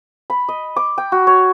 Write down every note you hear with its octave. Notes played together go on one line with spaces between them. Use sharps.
B5
D#5
D6
G5
F#4
C#5